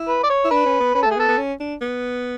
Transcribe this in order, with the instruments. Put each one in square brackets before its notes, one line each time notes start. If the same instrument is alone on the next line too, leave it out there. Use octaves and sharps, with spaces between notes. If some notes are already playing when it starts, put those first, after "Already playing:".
Already playing: [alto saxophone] E4
[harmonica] B4
D5
C#5
[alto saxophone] E4
[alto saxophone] D4 [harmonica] B4
[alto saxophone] C#4
B3
[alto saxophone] C#4 [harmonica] B4
[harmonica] A4
[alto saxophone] A3
[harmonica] G#4
[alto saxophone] B3
[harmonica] A4
[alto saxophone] B3
C#4
D4
B3